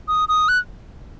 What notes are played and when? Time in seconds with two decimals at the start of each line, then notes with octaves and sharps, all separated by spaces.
0.08 D#6
0.29 D#6
0.48 F#6